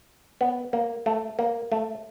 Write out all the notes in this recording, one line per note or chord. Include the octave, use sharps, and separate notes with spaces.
B3
A#3
A3
A#3
A3